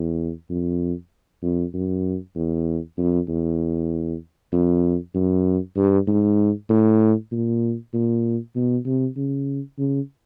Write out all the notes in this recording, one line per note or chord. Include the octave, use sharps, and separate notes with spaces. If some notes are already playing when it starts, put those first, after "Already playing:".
Already playing: E2
F2
F2
F#2
E2
F2
E2
F2
F#2
G2
G#2
A2
A#2
A#2
B2
C3
C#3
C#3